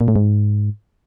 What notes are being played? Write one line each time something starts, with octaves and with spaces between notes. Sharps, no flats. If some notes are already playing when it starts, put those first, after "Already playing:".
A#2
A2
G#2